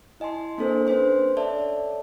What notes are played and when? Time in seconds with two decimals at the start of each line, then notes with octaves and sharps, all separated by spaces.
0.20 E4 D#5 G#5 A5 C6
0.58 A#3 C4 D4 A4 A#4 C5
0.87 C#4 D4 B4 C5 C6
1.36 A4 C#5 D5 E5 A5